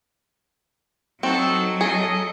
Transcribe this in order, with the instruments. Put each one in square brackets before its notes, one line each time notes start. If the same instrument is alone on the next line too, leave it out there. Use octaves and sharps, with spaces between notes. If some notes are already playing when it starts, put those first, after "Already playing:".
[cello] F#3 [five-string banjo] C4 [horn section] D#4 F#4 A4
[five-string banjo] G#4 [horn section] A4 D#5